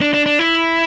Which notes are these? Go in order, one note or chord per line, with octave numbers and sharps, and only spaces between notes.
D4
D4
D4
E4